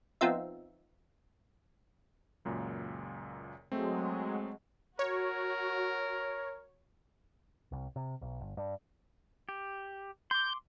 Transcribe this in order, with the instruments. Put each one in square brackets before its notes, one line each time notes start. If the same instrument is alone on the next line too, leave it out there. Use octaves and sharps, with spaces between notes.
[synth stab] F3 B3 C4 D#4 F4 E5
[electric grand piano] C#2 F#2 A#2
[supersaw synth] F#3 G#3 [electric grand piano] A3 C4
[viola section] F#4 [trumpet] A#4 [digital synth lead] C#5
[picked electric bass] C2
C3
B1
G1
G2
[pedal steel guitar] G4
[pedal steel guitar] C6 D6 [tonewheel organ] G6